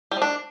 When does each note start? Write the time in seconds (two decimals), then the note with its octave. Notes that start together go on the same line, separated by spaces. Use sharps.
0.11 G3
0.17 F3
0.22 D4